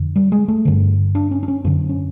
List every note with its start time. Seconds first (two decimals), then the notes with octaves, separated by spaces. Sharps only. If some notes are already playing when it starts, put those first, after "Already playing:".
Already playing: F2 D3
0.16 G3
0.32 G#3
0.48 A3
0.65 G2 D3
1.15 D4
1.31 C#4
1.43 D4
1.48 C#4
1.65 F#2 D3 C4
1.89 C#4